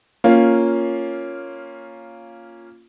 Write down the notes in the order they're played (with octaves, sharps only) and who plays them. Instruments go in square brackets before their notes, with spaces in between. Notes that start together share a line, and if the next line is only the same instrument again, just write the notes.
[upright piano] A#3 C#4 F4